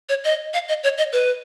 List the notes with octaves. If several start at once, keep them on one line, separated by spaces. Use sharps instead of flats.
C#5
D#5
F5
D#5
C#5
D#5
B4